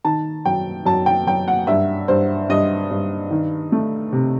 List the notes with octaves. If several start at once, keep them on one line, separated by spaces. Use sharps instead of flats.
D#3 A5
F#2 G5
F#2 A5
G5
F#2 G5
F#5
G2 E5
G2 C5
G2 D#5
G2
D#3
A3
C3